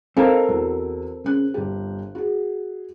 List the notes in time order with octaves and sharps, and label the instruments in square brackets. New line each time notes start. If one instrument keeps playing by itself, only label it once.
[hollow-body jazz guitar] C4 A4 A#4 [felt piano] D#4 F5 G#5
[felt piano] E2 F#4
C#3 F#6
G1 G4
F#4 G#4